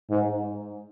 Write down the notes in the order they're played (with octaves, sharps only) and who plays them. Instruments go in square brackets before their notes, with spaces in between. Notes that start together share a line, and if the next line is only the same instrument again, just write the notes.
[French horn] G#2